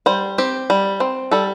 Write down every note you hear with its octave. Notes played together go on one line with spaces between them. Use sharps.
G3 C5
C4 G4
G3
C4
G3 A4